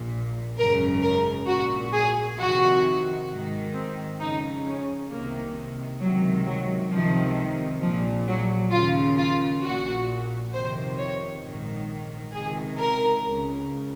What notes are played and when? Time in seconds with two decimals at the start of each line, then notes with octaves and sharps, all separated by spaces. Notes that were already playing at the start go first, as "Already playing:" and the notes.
Already playing: A#1 A#2
0.57 G#1 F#2 C#3 A#4
1.02 A#4
1.48 A#1 A#2 F#4
1.93 G#4
2.38 F2 C3 D#3 F#4
3.28 G#1 G#2 D#3
3.74 C4
4.19 F2 C#3 D#4
4.65 C#4
5.10 C2 C3 D#3 A#3
6.00 C#2 C3 D#3 F#3
6.45 F#3
6.90 C#2 C3 D#3 F3
7.81 A#1 A#2 F3
8.27 F#3
8.71 D#2 C#3 F4
9.16 F4
9.61 A#1 A#2 F#4
10.52 F2 C3 D#3 C5
10.97 C#5
11.42 A#1 G#2 D#3
12.33 C#2 C3 D#3 G#4
12.78 A#4
13.23 C#2 C#3